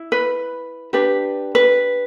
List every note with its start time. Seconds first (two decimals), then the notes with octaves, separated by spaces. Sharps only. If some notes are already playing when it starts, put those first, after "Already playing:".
Already playing: E4
0.12 B4
0.93 D4 G4 B4
1.55 B4